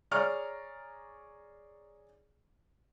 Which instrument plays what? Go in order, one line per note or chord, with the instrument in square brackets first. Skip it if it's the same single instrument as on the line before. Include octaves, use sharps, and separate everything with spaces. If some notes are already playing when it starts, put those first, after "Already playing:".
[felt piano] G#4 C#5 D5 A#5 C#6 F6